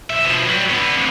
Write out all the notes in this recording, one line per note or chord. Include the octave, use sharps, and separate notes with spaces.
B1 E5
B2 F3
F#3 G3
D3 B3
F2 B2